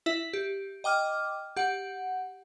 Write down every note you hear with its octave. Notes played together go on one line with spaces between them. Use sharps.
E4 E5
G4
D#5 G5 D6 F6
G4 F#5